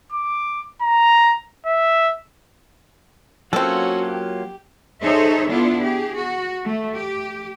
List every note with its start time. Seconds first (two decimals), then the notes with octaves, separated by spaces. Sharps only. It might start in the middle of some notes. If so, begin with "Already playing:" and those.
0.12 D6
0.82 A#5
1.66 E5
3.53 F#3 A#3 C4 C#4 F4 F#4 A4
4.07 G4
5.02 D#4 G#4 A4 C5 C#5 E5
5.48 B3 D4 E4 F4 A4
5.81 G4 G#4
6.16 F#4
6.64 A3
6.95 G4